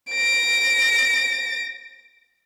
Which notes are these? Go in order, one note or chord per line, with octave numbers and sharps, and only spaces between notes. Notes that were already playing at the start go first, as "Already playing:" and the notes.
A#6 D7